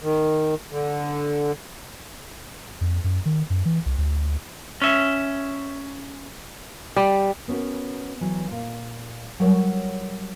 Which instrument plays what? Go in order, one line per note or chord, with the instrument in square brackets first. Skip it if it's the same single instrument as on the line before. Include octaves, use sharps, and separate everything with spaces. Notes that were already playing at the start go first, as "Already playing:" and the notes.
[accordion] D#3
D3
[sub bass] F2
F#2
D#3
F#2
E3
C2
D2
[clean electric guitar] C#4 E5
[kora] G3
[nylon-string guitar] B3 C#4 F#4 A#4
E3 F#3
A#2
F#3 G3 A#4 C#5 D5 F#5